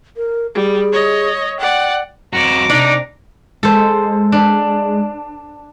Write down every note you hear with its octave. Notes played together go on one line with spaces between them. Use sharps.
A#4
G3 G#4
C#5 D#5
D5 F#5 G5
F2 F#4 A#5 D6
C3 D4 D#4 D5
G#3 A4 C5
D4